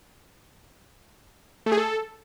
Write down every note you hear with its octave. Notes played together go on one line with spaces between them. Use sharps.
A3
G#4
A4